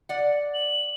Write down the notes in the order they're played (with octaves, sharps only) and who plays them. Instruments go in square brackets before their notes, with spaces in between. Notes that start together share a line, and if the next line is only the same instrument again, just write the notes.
[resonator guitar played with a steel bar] D5 F#5
[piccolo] F#7